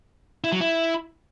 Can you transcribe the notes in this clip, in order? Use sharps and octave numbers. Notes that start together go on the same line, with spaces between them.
E4
F#3
E4